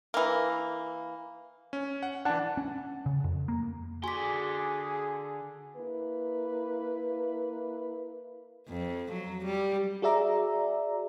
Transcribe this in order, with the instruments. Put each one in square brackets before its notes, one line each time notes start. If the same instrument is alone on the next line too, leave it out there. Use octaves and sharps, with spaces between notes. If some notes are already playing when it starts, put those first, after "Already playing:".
[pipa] E3 A#3
[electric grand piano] C#4
F#5
[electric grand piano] E3 D4 [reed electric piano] F#5 A5
[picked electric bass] C#4
C#3
F2
A#3
[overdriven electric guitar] D3 C6 [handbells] F#4 D6 [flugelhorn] G#4 [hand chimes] G#5 B6
[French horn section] A#3 E4 B4
[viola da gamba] F2
F#3
G3
[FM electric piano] F#4 G#4 D5 E5 A#5